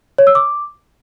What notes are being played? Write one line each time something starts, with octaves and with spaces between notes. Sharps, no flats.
C#5
E6
D6